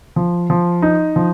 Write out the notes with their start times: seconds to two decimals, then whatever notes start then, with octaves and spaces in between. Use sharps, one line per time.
0.16 F3
0.50 F3
0.82 D#4
1.16 F3